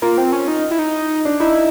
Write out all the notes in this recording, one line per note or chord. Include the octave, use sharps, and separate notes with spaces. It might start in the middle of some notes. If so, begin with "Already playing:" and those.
A#3 F4
C4
C#4
D#4
E4
D#4
D4
D#4 E4